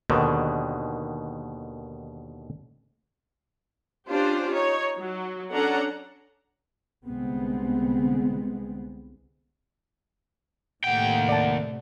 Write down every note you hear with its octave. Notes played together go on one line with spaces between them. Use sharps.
D#2 B2 D3 D#3
C#4 D4 F4 G4 C5
D#4 C#5
F#3
C#4 D4 A4 F#5 A#5
C2 D3 G#3 B3 C4
D#2 A2 C3 A3 F#5 G5
D5 A5